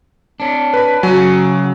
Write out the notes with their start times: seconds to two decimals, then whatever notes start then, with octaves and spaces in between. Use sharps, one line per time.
0.40 D4 C#5
0.74 B4
1.03 C#3 F#3 G#5